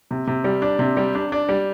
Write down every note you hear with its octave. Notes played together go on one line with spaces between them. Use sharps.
C3
C3
G3
D4
C3
G3
D4
D4
G3